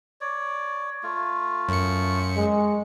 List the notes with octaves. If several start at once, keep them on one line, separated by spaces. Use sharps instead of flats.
C#5 D5
A3 F4
F#2 C#7
G#3